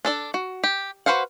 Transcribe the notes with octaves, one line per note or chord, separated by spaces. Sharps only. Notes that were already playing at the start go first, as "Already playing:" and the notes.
D4 A4 D5
F#4
G4
F#4 B4 C5 F5 F#5